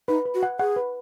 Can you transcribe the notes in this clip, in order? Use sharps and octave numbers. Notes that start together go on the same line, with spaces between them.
D#4 B4
B4
F#4
F#5
G#4 F#5
B4